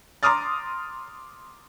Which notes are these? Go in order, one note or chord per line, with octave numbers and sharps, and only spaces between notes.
A#5 C6 D6 D#6 F6 A6